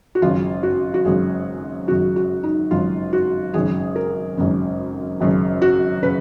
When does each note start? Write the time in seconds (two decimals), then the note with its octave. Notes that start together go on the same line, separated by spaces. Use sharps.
0.15 F#4
0.22 G#1 F#2 C#3 F4
0.63 F#4
0.94 F#4
1.05 G#1 F#2 C#3 G#4
1.88 G#1 F#2 C#3 F#4
2.16 F#4
2.43 D#4
2.71 G#1 F#2 C#3 F4
3.13 F#4
3.54 G#1 F#2 C#3 G#4
3.96 A#4
4.37 G#1 F#2 C#3
5.20 G#1 F#2 C#3
5.62 F#4
6.02 C#3 B4